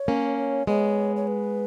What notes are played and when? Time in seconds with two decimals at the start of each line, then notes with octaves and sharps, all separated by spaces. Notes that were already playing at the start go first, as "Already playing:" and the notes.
Already playing: C#5
0.08 A#3 C#4
0.67 G#3 B3 C#5
1.16 C#5
1.27 B4